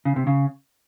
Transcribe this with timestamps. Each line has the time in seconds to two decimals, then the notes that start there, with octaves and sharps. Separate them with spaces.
0.05 C#3
0.16 C3
0.27 C#3